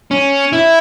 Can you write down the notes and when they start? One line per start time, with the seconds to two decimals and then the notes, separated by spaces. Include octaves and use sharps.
0.11 C#4
0.52 E4